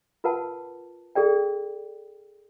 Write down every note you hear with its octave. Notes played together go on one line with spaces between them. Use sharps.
F4 A#4 B4 F#5 A5
G#4 A4 D5 G5